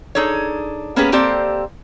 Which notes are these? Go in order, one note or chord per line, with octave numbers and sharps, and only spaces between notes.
D4 D#4 G#4 A4 C#5
A#3 B3 C#4 G4 G#4 B4
A#3 C4 G4 A4 C5 D5